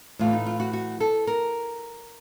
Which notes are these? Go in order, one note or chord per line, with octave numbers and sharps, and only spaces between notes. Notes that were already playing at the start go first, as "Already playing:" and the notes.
A2 E3 A3 F4
D#4
F4
F#4
F#4
A4
A#4